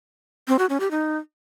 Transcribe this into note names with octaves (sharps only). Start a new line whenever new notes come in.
C4
F#4
C#4
G4
D#4